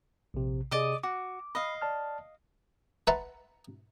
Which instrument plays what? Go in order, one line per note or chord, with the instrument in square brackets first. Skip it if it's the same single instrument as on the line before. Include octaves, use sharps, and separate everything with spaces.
[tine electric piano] A#1 C3
[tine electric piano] C3 G#4 [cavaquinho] D5 D#5 D#6
[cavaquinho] F#4 [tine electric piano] D6
[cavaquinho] D#5 F5 [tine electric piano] B5 D#6
[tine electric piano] D5 A5 F6
[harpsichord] B4 E5 F#5 A5 A#5 C6